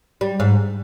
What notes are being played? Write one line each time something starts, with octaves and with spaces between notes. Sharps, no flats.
G3
G#2